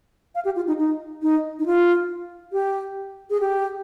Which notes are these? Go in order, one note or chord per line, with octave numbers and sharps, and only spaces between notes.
F5
G4
F4
D#4
D#4
D#4
D#4
F4
G4
G#4
G4